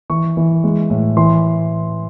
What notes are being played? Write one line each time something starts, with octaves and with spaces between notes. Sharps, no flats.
E3 C#6
E3
G#3
A2
E3 C6